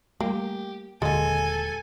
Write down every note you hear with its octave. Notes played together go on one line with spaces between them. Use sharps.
G3 A3 A#3 G4
D#1 D3 G#3 A#3 A4 G#5